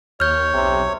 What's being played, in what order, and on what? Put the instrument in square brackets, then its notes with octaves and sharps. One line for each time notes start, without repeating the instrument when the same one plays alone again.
[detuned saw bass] D#2 [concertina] C#5 [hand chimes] F6 G6
[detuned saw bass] B1 [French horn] C3